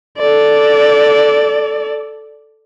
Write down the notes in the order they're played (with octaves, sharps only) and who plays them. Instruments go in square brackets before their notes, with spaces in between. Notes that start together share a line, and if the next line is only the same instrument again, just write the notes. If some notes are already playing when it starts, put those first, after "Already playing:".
[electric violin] A4 D5